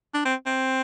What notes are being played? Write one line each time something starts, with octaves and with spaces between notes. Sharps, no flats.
D4
C4
C4